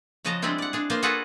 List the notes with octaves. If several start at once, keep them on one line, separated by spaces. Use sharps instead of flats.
C#3 F3 F#4 D#5 A5 A#5
G3 G#3 C4 D4 E4 F4
D5 F#5
D4 G#4
A#3 B3 F4 C5 F5
F4 F#4 G#4 A4 B4 F#5